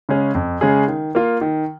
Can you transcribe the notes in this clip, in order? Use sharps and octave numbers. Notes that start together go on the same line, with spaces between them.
C#3 G#3 C#4 G#4
F2
C#3 G#3 C#4 G#4
D#3
A#3 F4
D#3